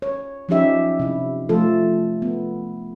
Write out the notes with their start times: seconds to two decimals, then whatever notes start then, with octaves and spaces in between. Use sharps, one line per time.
0.02 C#5
0.49 F3 F#3 C#4 D#4 G4 E5
1.00 C3 E4
1.49 F3 A3 F4 A4
2.22 B3